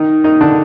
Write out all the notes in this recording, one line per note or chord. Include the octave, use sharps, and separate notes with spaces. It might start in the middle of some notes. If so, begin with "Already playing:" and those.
Already playing: D#3 D#4
D#3 D#4
D3 D4